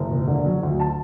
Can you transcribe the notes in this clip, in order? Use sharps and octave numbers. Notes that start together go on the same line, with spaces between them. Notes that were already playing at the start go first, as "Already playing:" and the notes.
Already playing: F#1
E1
D3
F#3
D2
A5